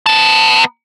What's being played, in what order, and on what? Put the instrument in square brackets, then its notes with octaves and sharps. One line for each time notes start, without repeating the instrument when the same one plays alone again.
[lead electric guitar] B3 A5